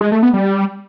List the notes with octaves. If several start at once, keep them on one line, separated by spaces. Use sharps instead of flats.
G#3
A3
B3
G3